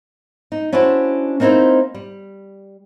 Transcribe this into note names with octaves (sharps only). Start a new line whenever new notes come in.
D#4
C#4 D4 E4 F#4 C5
A#3 C4 D#4 E4 A#4 C5
G3